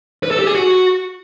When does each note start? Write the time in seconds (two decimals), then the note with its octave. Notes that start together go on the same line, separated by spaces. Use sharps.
0.23 B4
0.31 A4
0.39 G4
0.47 G#4
0.55 F#4